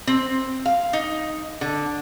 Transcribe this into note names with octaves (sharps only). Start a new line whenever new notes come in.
C4
F5
D#4
D3